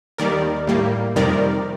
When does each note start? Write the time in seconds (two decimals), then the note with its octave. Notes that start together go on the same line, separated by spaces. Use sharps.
0.18 D#2 D#3 G3 A#4 D5
0.67 A2 G3 A#3
1.16 F2 C3 D#3 G3 A#4 D5